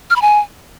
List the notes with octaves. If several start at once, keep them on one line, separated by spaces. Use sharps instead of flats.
F6
B5
G#5